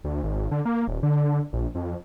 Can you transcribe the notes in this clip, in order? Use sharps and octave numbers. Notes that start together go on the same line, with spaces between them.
D2
G#1
D3
A#3
D#1
D3
A#1
F2